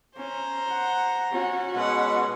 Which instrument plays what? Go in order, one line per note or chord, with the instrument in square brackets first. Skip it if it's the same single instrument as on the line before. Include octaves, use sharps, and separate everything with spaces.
[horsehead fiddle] C#4 [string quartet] C5 A#5
[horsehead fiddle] F#5
C#4 F#4
[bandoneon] B2 G#3 [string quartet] B4 F#5